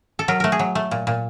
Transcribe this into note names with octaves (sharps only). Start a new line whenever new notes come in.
A4
F#3 A#4
A3 A#4
G#4
F#3
A3
A#2
A#2